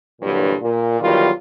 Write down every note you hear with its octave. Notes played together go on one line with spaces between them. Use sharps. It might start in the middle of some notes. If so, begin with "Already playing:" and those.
G2 A#2 D3 E3 F#3
A#2
E2 D#3 F#3 G3 F4